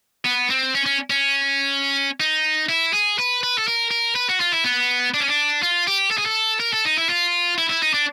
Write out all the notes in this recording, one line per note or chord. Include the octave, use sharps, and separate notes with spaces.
B3
C4
C#4
C#4
C#4
D#4
E4
G#4
B4
B4
A4
A#4
A#4
B4
F#4
F4
E4
B3
D4
C#4
D4
F4
G4
A4
G#4
A4
A#4
A4
D#4
E4
F4
E4
E4
D#4
D4